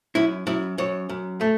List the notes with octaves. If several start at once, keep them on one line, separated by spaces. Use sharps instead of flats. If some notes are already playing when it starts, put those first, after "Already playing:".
F#2 E4
F#2 E4
F#2 C#5
F#2
A3